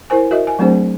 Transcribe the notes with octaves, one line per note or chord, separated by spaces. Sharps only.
E4 A#4 C5 G#5
F#4 A#4 D#5 E5
G#5
F#3 A3 C4 D4 G#4 C5